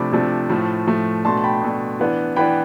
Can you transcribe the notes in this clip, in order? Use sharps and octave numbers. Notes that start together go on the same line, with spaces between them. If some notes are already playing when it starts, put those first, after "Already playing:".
Already playing: C3 F3 A3 D4 B5 D6
C3 F3 A3 D4
A2 F3 A3
A2 F3 A3
B2 A3 D4 A5 C6
A5
G5 B5
B2 A3 D4
E3 B3 D4
E3 B3 D4 G5 B5